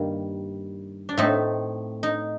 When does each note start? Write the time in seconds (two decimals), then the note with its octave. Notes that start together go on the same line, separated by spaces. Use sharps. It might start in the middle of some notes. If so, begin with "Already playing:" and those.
Already playing: G2 D#3 G3 A#3
1.09 D4
1.17 A2 A3 C4 D#4
2.03 D#4